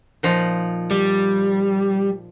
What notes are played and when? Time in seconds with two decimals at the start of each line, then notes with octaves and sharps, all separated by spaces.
0.23 A#2 F3 D#4
0.91 G3